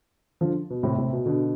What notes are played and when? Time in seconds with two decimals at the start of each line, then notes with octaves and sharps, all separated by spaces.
0.41 D3 F3
0.70 B2
0.83 A2 C3
0.97 A2 C3
1.13 B2
1.26 B2 D3